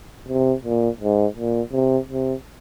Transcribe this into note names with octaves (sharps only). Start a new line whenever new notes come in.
C3
A#2
G#2
A#2
C3
C3